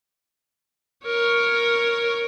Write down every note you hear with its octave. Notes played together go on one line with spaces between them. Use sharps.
A#4 C#5